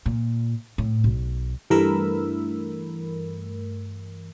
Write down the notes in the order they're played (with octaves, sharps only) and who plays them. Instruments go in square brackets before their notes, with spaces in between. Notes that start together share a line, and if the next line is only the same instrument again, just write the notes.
[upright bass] A#2
A2
B1
[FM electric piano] G2 E3 A3 A#4 B5 E6